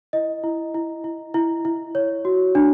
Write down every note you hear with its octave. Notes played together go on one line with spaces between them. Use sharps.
E4 D#5
E4
E4
E4
E4
E4
C#5
F#4
D4